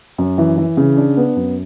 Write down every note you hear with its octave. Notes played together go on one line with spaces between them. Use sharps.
F#2
E3
E3
C#3
D4
B3
F#2